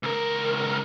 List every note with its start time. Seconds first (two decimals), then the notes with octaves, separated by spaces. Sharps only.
0.03 C#2 A#4